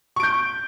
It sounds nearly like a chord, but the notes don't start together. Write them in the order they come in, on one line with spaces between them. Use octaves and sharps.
C#6 D7 G6